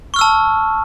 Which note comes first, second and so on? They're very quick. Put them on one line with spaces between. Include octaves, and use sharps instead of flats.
C#6 F6 E6 A5